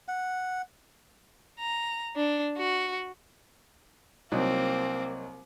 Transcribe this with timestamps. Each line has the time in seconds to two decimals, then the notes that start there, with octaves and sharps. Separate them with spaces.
0.08 F#5
1.60 A#5
2.16 D4
2.58 F#4
4.32 C2 F#3 A#3 C4 D#4